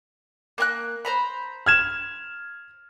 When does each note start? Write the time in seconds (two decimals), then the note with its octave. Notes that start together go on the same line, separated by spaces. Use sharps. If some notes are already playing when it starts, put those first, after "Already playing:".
0.58 A#3 G#5 F#6
1.05 C5 A#5 B5
1.66 F6 G#6 E7